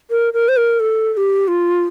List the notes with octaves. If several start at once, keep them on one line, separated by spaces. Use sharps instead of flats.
A#4
A#4
C5
A#4
A4
A4
G4
F4